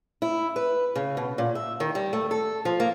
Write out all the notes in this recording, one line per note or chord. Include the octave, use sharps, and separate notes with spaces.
E4
B4
C#3
B2
A#2
E5
D#3
G3
A3
A4
F3
A#3